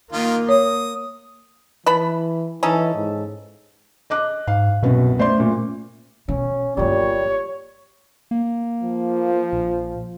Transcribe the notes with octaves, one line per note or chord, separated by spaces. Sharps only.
D#3 A#3 F4
C#5 D#6
E3 B4 A5 B5
E3 C#4 D#4 A4
G#2
D#5 D6 F#6
G#2 F5
C2 F#2 B2 B3
A3 C5 D5 C6
F#2 A#2
B2 C#4
G1 A#2 F#3 G3 C#5
A#3
F3
A#1